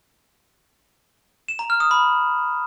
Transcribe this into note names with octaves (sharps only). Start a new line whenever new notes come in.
E7
A#5
F6
D#6
B5